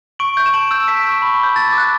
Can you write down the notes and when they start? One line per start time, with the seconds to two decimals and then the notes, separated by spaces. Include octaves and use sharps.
0.19 C#6 D7 F#7
0.37 G6
0.46 E7
0.54 A5 D7 F#7
0.71 E6 G6
0.88 A5 B6 D7
1.05 C#6 E6 G6
1.22 B5
1.39 D6 G6
1.56 A5 A6
1.73 D6
1.78 F#6